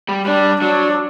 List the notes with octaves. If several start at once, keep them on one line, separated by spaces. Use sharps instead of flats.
G3
G3 D4
F#3 D4